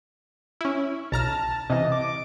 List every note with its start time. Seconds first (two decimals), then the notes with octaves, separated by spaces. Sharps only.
0.61 C#4 E4
1.12 B1 A5 A#5 F6
1.70 C3 E3 D#5
1.92 D6